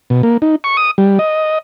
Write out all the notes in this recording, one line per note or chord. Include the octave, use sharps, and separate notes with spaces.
B2
A#3
D#4
C#6
D#6
G3
D#5